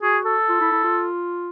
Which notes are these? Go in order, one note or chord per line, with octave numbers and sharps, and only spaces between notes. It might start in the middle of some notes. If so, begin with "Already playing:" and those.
F#4 G#4
A4
F4
E4
E4
F4